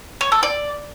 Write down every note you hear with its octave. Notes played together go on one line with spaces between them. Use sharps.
C#5
A4
D5